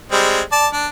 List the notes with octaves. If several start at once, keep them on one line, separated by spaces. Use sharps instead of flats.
G3 G#3 C4
D5 A5
D4